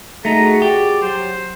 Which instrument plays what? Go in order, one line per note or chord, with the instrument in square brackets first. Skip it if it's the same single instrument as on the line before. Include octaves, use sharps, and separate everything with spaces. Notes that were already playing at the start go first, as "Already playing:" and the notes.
[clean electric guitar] A3 D#4 [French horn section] F#4 G#4 [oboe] A#5
[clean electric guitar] G4 [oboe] D5
[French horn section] F#3 [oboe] C5